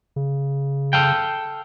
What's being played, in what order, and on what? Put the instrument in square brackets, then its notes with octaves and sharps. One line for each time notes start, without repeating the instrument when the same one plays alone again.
[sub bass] C#3
[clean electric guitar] A4 F5 G5